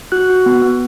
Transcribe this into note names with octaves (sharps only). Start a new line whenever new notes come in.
F#4 F#6
F#4
B3
B3